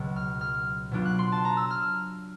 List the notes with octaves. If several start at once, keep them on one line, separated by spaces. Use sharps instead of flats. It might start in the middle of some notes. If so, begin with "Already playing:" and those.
Already playing: C#2 B2 F#3
F6
F6
B2 F#3 B3 D4 F4
F#6
C6
A5
A#5
E6
F6